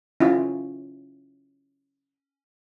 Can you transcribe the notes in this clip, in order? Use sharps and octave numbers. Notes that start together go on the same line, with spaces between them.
C#4 E4 F4